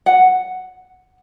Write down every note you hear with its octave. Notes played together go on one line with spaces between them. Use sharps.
F#5